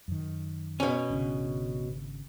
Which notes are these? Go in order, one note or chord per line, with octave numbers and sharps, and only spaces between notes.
F#2 D#3
B2 C#4
G#1 C#3 D4